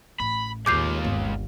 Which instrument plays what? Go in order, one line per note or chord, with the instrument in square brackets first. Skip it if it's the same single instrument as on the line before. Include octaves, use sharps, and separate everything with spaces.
[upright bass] A1 [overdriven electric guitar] B5
[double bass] D#2 [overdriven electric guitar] G#3 F4 [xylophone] D6 G6 C7
[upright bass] G1